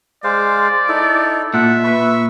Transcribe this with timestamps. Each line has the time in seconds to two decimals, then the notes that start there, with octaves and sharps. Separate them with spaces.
0.24 G#3 C5 D5 F5
0.89 D#4 E4 A4
1.54 A#2 A4 E5 F#5
1.84 B4 B5 C#6